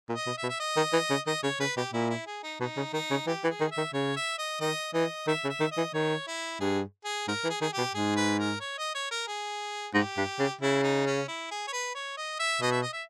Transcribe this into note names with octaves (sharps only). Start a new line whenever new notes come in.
A#2
D#5
B2
E5
B2
E5
D#5
D#3
E3
C#3
D#3 D#5
C#3 C#5
C#3 B4
B2 G4
A#2 E4
E4
G#4
D#4
B2 D#4
C#3
D#3 D#4
C#3
E3 G4
E3
G#4
D#3
E5
D#3
C#3 C#5
E5
D#5
D#3 D#5
E3 D#5
D#3 E5
C#3
E5
D#3
D#5
E3
D#3 C#5
E4
G2 G#4
G#4
G#2 A#4
E3
G#4
D#3 G#4
B2 G4
G#2 G#4
B4
A#4
C#5
D#5
C#5
A#4
G#4
G#2 G4
G2
C#3
C#3 E4
D#4
C#4
E4
G#4
C#5
B4
C#5
D#5
E5
B2 D#5
E5
D#5
E5